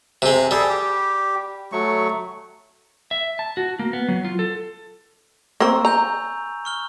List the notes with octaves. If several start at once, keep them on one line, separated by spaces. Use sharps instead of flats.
C3 G#3
G3 G#4 A4
G4
F#3 A3 C#6
E5
A5
F#4
A#3
B3
F#3
F4
A4
A#3 C4 A#5 C#6 E6
G#5 A#5 G6 F7
C#6 F6 G7